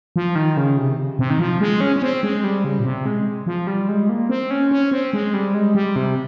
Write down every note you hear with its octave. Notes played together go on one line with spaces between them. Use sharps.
F3
D#3
C#3
C3
C3
D#3
F3
G#3
C#4
C#4
C4
G#3
G3
C#3
A#2
C3
G#3
F3
G3
G#3
A#3
C4
C#4
C#4
C4
G#3
G3
G#3
G3
C3